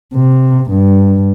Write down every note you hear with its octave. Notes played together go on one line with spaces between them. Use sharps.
C3
G2